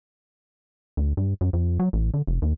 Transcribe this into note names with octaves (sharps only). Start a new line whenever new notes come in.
D2
G2
F#2
F2
F#3
A1
D3
F1
D#2